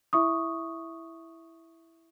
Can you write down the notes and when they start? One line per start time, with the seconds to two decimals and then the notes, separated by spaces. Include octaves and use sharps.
0.13 E4 E5 C#6 D#6